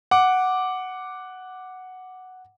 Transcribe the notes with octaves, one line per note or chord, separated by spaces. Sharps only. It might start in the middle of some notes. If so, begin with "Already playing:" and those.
F#5 D6